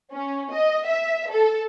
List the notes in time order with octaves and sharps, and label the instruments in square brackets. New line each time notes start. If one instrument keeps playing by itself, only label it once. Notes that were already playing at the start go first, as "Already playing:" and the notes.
[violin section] C#4
D#5
E5
A4